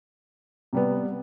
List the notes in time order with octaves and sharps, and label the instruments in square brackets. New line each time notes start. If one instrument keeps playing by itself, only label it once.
[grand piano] C3 G3 B3